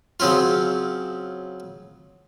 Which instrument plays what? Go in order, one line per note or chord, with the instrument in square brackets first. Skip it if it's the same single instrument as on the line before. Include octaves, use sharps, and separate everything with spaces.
[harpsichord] C#3 F#3 C4 C#4 F4